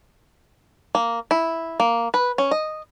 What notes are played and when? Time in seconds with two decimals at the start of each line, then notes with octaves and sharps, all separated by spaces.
0.95 A#3
1.31 E4
1.80 A#3
2.14 B4
2.38 C#4
2.51 D#5